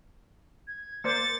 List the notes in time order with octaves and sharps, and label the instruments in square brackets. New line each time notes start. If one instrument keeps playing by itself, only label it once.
[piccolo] G#6
[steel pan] A#3 C5 D5 [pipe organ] A6 [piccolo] C#7